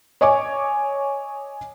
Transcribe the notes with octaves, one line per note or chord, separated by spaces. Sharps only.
C#5 D#5 G#5 C#6 D6